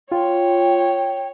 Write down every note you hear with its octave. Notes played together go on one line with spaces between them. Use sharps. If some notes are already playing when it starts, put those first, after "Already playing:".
F4 C#5 G5